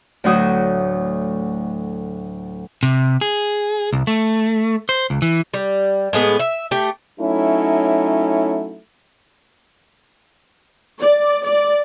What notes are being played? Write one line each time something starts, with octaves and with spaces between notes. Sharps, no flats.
D2 A2 F#3 F#4 D#6
C3
G#4
C2
A3
C5
C#2
E3
G3
A2 G#3 B3 G#4
E5
A3 G4
F#3 A3 C#4 D#4 E4
D5
D5